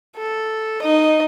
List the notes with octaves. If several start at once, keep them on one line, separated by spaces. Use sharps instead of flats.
A4
D#4 D#5